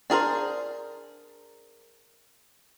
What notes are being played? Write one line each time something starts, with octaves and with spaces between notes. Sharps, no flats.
D4 G#4 A#4 C5